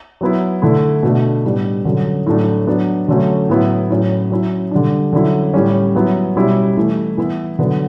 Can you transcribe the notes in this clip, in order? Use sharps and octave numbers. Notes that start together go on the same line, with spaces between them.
F#3 B3 E4
D3 A3 E4
B2 A3 D4
A2 G3 B3 D4
D3 F#3 C#4
A2 F#3 A3 D4
F#3 B3 D4
D3 F#3 A3 C#4
A2 F#3 B3 E4
A2 F#3 C#4
F#3 C#4 E4
D3 G3 D4
D3 F#3 C#4 E4
A2 G3 C#4
F#3 B3 E4
B2 G3 C#4 E4
E3 A3 E4
E3 B3 E4
D3 F#3 B3 D4